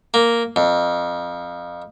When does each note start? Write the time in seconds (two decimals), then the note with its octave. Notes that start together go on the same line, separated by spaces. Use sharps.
0.14 A#3
0.56 F2